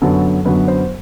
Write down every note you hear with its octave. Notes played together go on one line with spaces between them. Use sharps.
F#2 D3 F#3 B3 A4
F#2 D3 F#3 B3 B4
C5